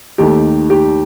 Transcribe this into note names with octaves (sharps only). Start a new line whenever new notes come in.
D#2 D#3 A3 G4
G4